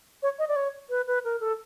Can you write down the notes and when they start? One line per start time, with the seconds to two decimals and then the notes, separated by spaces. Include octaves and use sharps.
0.23 C#5
0.39 D#5
0.48 D5
0.56 C#5
0.90 B4
1.07 B4
1.24 A#4
1.40 A4